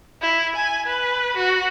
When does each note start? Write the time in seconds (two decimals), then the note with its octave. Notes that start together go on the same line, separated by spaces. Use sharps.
0.22 E4
0.55 G#5
0.86 B4
1.36 F#4